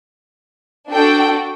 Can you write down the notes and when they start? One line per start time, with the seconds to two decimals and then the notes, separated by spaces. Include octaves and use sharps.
0.91 D4 F#4 A4 G5